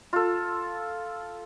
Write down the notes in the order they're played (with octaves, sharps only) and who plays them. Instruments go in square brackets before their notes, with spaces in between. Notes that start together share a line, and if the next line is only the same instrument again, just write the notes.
[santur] F4 A4